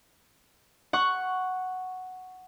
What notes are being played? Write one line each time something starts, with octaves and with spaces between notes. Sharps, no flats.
F#5 C#6